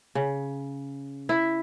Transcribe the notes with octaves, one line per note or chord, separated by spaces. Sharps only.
C#3
E4